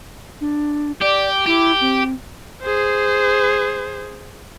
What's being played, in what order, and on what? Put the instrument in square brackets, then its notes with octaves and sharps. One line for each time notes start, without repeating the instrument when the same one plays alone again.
[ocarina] D4
[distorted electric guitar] G4 [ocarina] D5
[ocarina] E4 [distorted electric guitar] G4
[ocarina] C4
[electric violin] G#4 C5